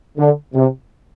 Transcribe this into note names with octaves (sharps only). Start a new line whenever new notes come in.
D3
C3